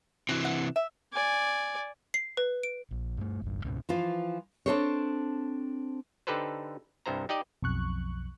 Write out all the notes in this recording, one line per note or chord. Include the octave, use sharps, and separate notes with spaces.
C3 E3 F#4
F#5
E5
D5 G#5
C7
B4
D7
A#1
G2 A3
G1 C2 G2
C#2 G#2 B2 C#4
E3 F3 F4
C4 D4 D#4 A4 C5 C#5
D3 D#4 G4 A4 B4 C5
C2 G2 C5 A#5
D#4 G4 D5 D#5
B1 F2 C#6 F#6